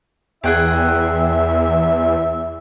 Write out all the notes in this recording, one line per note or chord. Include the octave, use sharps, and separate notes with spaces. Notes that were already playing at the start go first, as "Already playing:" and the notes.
E2 G#4 E5 F#5 G5